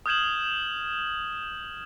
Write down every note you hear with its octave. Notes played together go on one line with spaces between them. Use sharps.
D#6 F6 G6 G#6 E7 F#7